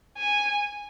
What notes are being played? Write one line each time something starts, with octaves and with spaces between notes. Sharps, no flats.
G#5